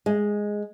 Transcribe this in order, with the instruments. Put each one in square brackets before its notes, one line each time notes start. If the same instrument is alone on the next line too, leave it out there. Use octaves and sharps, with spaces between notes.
[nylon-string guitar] G#3